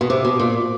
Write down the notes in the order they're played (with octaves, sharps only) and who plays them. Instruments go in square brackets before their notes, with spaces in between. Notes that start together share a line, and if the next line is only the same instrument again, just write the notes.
[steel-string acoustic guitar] B2
[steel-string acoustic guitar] C3 [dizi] D6
[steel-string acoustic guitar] B2
A#2